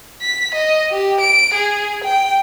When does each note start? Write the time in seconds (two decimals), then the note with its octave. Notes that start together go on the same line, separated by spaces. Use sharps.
0.22 B6
0.55 D#5
0.91 G4
1.21 D7
1.54 G#4
2.04 G5